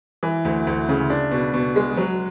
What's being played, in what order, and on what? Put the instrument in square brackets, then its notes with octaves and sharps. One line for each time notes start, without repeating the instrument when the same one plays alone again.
[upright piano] E3
D2
D2
C#3
D4
B2
B2
G#3
F#3